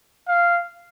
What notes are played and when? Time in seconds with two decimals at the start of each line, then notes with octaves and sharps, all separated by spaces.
0.28 F5